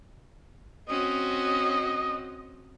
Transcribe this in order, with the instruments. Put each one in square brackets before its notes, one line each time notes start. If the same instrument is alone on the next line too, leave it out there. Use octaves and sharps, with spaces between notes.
[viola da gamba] C4 C#4 F#4 [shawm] D#5